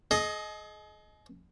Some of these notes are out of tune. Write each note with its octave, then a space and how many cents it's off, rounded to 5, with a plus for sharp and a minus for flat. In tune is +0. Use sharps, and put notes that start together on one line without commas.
G#4 +40 D#5 +0